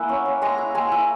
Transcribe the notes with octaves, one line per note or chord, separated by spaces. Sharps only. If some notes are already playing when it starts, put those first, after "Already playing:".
Already playing: A#3 E4 F#5 G#5
C#4
C#4
G#3 G#5 A#5
E4
G#3 G#5 A#5
E4